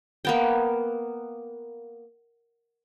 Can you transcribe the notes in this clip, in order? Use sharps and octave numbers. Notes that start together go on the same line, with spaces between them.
A#3 B3 G5